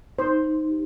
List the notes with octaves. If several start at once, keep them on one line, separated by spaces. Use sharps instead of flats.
D#4 C5
D#4
G4